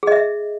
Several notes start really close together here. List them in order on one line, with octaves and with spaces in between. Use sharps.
G#4 D#5 E5